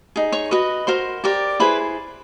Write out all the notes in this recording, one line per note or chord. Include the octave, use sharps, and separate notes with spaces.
D#4 G#4
C#5 C#6
F#4 B4 D#5
F#4 A#4 C5 C6
G4 A#4 D5
E4 G#4 B4 C5 B5